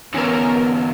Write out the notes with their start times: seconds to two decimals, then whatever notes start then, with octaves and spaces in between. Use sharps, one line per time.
0.14 E2 D3 B3 C#4 A#4